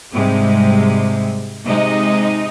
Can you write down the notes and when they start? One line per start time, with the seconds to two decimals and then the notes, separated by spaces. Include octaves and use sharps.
0.12 G#2 C3 G3 G#3
1.66 C3 G#3 D#4 D#5